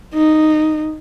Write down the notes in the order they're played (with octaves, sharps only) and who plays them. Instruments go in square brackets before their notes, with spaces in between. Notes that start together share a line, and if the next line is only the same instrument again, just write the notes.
[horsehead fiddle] D#4